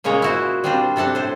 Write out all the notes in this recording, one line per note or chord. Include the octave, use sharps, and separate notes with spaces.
A#2 C#3 G#3 A#3 C#5 A#5
E4 F#4 C5
G3 C4 D4 F4 C5
C3 D4 A4 F#5 A5
A2 C5